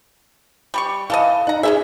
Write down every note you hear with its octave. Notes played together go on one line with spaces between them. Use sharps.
G3 G4 C#6
E3 A4 D#5 F5
D#4 F#5 A#5
C#4 E4 G#4 E5